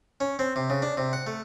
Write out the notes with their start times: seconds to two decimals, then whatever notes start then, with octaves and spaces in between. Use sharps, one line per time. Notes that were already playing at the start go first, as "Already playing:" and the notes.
0.20 C#4
0.39 C4
0.56 C3
0.70 C#3
0.82 D4
0.97 C3
1.13 F#5
1.27 A3